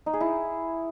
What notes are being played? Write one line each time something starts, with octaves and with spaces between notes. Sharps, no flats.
D#4
G#4
E4